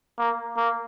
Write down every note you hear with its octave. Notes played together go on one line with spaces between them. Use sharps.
A#3
A#3